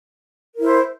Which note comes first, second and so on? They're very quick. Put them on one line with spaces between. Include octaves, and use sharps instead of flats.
A#4 E4 C5